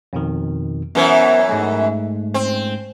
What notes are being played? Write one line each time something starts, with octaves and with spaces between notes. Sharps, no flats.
F2 B2 D#3
F#2 E3 B3 A#4 C5
G#2 G#3 A3
C4